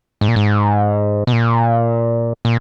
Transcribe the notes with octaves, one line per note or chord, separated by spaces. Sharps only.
G#2
A#2
G#2
B2
A#2
A#2